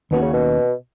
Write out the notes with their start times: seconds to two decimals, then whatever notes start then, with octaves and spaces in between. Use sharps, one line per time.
0.11 D#2 B2 D#3 A#3 C#4 F#4
0.22 C#3
0.33 B2